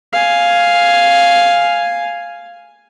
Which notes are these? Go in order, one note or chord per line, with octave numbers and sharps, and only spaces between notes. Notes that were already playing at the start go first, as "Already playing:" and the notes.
F5 G#5